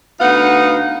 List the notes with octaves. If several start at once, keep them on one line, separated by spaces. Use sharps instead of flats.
D2 B3 D#4 F5 F#5